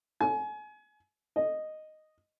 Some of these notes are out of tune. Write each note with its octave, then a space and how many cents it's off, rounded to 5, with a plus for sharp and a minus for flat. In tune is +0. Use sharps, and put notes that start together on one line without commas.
G#5 +30
D#5 -5